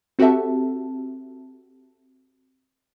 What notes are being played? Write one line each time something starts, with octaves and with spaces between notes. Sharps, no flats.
C4 F#4 G4 A4 E5 A5